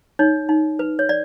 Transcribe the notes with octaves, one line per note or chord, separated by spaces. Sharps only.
D#4 C#5
D#4
B4
C#5
D5